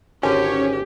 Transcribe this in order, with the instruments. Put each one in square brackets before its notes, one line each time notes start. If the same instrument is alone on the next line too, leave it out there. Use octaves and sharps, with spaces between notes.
[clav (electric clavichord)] G#1 D3 [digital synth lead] C#4 [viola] G4